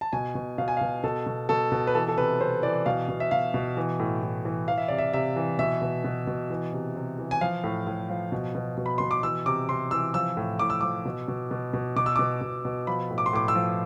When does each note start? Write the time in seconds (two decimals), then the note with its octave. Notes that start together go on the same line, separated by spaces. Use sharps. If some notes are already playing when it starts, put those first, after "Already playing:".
0.01 A5
0.13 B2 G#5
0.35 B2
0.58 B2 F5
0.68 G#5
0.77 F5
0.81 B2
1.04 B2 A4
1.26 B2
1.49 B2 A4
1.72 B2
1.87 B4
1.95 E3 A4
2.08 A4
2.17 C3 B4
2.40 C3 C5
2.63 E3 D5
2.86 B2 F5
3.08 B2
3.20 E5
3.31 B2 F5
3.54 B2
3.77 E3
4.00 A2
4.23 A2
4.45 E3
4.68 E3 F5
4.78 E5
4.88 C3 D5
4.98 E5
5.13 C3 E5
5.36 E3
5.59 B2 E5
5.82 B2
6.04 B2
6.27 B2
6.50 E3
6.73 C3
6.96 C3
7.19 E3
7.31 G#5
7.41 F3 F5
7.64 A2
7.87 A2
8.09 F3
8.32 B2
8.55 B2
8.77 B2
8.86 B5
8.98 B2 C6
9.11 D6
9.23 E3 E6
9.46 C3 D6
9.69 C3 C6
9.91 E3 E6
10.14 F3 E6
10.37 A2
10.59 A2 D6
10.70 E6
10.81 F3 D6
11.05 B2
11.28 B2
11.51 B2
11.73 B2
11.96 B2 D6
12.06 E6
12.16 B2 D6
12.41 B2
12.65 B2
12.87 F3 B5
13.10 A2
13.18 D6
13.26 C6
13.33 A2 D6
13.48 E6
13.55 F3